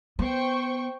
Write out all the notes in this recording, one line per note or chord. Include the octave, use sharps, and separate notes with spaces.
B3 C5 G5 C#6